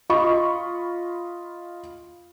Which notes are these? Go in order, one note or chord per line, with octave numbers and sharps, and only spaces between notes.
F4 D#5 B5 C#6